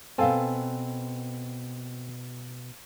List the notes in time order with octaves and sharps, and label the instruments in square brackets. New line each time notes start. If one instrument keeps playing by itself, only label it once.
[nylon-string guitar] B2 F5 G#5 [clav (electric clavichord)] C4 A4